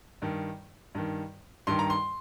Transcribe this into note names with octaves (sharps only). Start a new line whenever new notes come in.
G2 D#3
G2 D#3
G2 D#3 C6
A#5
C6